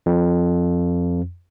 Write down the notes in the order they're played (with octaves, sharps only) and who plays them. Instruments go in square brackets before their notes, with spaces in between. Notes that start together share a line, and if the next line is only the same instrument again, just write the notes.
[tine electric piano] F2